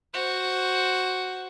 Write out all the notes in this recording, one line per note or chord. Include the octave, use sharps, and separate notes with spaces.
F#4 C5